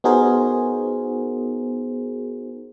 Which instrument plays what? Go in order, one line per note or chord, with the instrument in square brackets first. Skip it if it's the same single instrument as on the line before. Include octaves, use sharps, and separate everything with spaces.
[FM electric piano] B3 D#4 F#4 G#4 A#4 C5